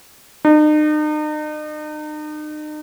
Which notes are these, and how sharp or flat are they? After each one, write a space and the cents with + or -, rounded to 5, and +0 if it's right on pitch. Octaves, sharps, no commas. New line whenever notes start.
D#4 -40